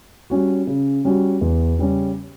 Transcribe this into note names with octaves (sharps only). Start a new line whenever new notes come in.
G3 C#4 F#4
C#3
G3 C#4 F#4
E2
C#3 G3 C#4